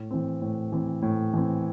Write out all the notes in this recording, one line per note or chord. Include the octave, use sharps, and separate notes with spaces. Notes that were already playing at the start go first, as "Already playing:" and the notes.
Already playing: A2
E3 C4
A2
E3 C4
A2
E3 C4